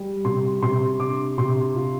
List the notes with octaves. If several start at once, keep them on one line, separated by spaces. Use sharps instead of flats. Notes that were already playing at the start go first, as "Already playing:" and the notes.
Already playing: G3
C3 C6
C3 C6
D4 D6
C3 C6
F4